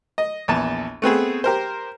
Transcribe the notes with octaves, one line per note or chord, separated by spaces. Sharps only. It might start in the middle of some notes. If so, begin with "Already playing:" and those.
D#5
A#1 E2 A5
A3 B3 C4 G#4
G4 A#4 C5